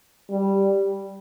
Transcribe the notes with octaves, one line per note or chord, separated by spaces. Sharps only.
G3